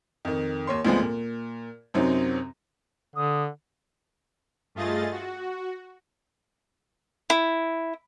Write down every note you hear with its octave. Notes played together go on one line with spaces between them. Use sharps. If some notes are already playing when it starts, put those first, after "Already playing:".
F2 D#3
D#2 C#5 C6
D2 F3 G#3 B3 C4
A#2
F#2 C3 F#3 C4 D#4
D3 D#6
G2 A3 F4 G#4 D#5 A6
F#4
E4